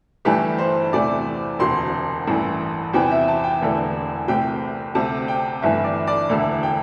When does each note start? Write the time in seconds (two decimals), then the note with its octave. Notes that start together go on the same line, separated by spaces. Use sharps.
0.25 G1 G2 E3 A3 G4
0.58 C5
0.93 E2 C3 E3 A3 D5
1.59 E1 D2 C3 C6
2.27 A1 G2 E3 A3
2.93 E2 C3 E3 G5
3.11 E5
3.28 A5
3.44 G5
3.62 E1 E2 D3 A3
4.28 C2 C3 A3 G5
4.95 D2 C3 A3 A5
5.28 G5
5.62 G1 G2 E3 A3 E5
5.84 D5
6.07 D5
6.29 E1 D2 D3 A3 E5
6.63 G5